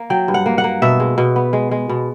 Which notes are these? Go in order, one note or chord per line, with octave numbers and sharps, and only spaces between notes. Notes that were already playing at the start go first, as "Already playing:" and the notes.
Already playing: A#3
F#3 G5
G2
F#5
A#3
F#5
A#3
B2 E5
G#3
B2
B3
G#3
G#3
B2